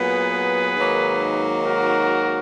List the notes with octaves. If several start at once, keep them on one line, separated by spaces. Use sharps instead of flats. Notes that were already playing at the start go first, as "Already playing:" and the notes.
Already playing: A#2 F#3 B3 G#4 B4
G#2 D#3 F#3 A#3
F#4 A#4